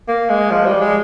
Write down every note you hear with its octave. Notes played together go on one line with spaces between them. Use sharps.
A#3
G#3
F3
G3
G#3